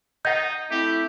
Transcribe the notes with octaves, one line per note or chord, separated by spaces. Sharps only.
D#4 D#5 F#5 G6
A3 C4 E4 G4